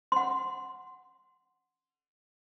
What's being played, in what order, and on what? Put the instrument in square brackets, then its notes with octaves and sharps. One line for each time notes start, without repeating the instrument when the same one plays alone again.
[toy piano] F#5 C6